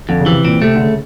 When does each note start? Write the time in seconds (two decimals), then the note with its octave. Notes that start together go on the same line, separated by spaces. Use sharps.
0.09 F2 D3
0.20 C#3
0.26 C3 E3
0.45 A#2 C4
0.62 C3 A3
0.75 D3
0.80 C#3